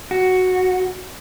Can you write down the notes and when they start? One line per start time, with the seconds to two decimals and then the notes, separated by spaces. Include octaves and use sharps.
0.11 F#4